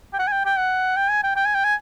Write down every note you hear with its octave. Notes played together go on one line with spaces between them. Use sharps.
G5
F#5
G#5
G5
G5
F#5
G5
G#5
G5
G5
G#5
G5
G#5